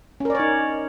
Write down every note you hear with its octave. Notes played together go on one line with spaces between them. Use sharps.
C#4 D#4 A#4 C#5 D5